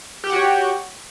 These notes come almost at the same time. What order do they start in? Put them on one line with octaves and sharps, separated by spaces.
G4 G5 F#5 F#4 C#5